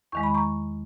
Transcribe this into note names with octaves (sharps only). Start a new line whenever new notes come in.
E2 D#3 G#3 C#6
B5
A#5 C#6